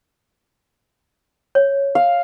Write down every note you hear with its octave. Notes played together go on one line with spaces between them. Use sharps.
C#5
F5